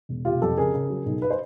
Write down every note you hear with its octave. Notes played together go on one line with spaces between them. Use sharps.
E1
F1 F4 G4
F2 G4 A4
C#3 G#4 A#4
C#3
F#3
B1
B4
C5